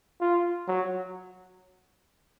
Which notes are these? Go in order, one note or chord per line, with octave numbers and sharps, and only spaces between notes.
F4
F#3